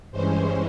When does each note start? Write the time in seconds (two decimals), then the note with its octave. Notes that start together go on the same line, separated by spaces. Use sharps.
0.11 G2 E3 G#3 C#4 C5